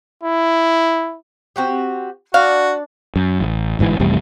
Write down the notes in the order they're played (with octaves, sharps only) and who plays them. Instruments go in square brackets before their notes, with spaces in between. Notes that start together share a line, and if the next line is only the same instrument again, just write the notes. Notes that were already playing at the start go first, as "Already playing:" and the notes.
[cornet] E4
[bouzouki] C4 F#4 G4
[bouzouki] D4 D5 [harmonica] F#4 [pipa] F5
[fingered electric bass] F#2
A1
G1 G#2 B2 E3
A1 F2 C3 G3